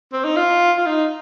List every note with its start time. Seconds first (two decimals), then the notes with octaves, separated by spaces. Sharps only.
0.13 C4
0.24 D#4
0.36 F4
0.77 F4
0.86 D#4